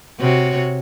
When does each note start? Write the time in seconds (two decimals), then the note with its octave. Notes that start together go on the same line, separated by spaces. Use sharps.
0.19 C3 F#4 C#5